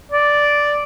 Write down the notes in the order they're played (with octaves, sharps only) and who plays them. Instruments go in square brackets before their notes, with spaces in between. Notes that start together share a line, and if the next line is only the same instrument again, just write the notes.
[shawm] D5